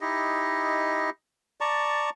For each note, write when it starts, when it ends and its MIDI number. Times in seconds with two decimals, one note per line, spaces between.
0.01 1.10 63
0.01 1.10 64
0.01 1.10 67
0.01 1.10 75
1.61 2.10 74
1.61 2.10 81
1.61 2.10 82
1.61 2.10 85